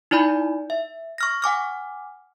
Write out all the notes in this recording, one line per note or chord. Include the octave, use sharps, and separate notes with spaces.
D#4 E4 D5 G#5 B5 G6
E5
C#6 F6 A#6
F#5 G#5 D6 F6